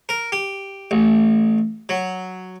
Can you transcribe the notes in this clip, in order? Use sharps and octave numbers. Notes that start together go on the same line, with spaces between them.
A#4
G4
A1
F#3